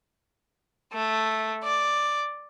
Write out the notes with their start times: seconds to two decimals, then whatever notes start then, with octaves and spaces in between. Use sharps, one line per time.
0.93 A3
1.64 D5